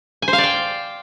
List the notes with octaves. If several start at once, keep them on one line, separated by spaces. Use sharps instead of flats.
G#5
C5
F5
D5
G5